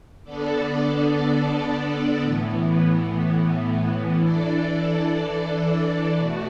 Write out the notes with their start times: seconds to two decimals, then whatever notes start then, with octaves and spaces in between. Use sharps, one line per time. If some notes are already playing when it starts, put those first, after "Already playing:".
0.24 D3 B3 D4 A4 D5
2.22 A2 E3 B3
4.19 E3 D4 A4 D5
6.16 B2 A3 F#4